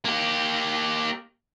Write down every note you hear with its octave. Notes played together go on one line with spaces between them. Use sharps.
A#3 G4